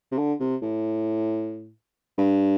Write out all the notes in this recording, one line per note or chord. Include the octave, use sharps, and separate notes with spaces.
C3
D3
C3
A2
G2